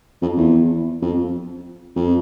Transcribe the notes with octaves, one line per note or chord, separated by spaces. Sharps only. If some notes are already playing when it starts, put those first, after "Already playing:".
F2
E2
F2
F2